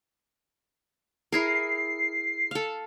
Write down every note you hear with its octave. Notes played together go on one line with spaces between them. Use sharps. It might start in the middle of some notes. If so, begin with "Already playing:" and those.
E4 G#4 A#4 C7
A4 F5